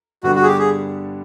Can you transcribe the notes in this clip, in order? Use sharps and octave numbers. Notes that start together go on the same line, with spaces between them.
G2 D3 G3 B3 D4 F#4
F#4
G#4
G4
G#4